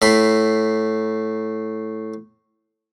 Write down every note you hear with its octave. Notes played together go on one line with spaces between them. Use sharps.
A2 B5 C6